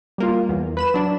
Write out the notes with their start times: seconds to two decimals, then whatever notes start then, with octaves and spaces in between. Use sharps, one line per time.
0.18 G3 A#3 F4
0.49 E2
0.77 B4 B5 E7
0.94 F#3 D4